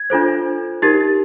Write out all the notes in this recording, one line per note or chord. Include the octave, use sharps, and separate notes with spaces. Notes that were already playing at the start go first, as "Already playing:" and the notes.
Already playing: G#6
D4 F4 A4 C5
D#4 G4 A#4 A6